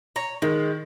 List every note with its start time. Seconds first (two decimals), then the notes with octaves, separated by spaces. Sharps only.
0.16 C#5 A#5
0.42 D#3 G#3